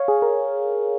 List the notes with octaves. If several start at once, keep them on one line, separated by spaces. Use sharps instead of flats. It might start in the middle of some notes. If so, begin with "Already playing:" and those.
Already playing: C#5 F5
G#4
A#4